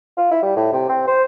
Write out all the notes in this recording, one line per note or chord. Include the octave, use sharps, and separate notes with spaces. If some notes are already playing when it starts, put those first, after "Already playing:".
F4
E4
G3
A2
C3
C4
C5